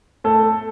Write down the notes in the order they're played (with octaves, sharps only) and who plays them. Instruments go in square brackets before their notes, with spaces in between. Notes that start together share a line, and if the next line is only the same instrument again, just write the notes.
[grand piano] A3 A4